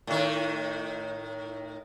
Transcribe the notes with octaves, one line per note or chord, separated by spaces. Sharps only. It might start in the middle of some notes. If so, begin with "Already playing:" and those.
A2 D#3